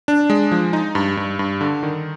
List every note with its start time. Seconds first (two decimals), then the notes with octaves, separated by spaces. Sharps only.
0.08 D4
0.30 G#3
0.52 F3
0.73 D#4
0.95 G2
1.17 G2
1.39 G2
1.61 D3
1.83 D#3